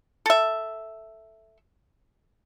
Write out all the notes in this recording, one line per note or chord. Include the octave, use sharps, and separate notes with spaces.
A4 E5